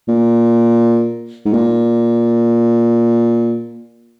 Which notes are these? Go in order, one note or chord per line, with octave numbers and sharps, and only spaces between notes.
A#2
G#2
A#2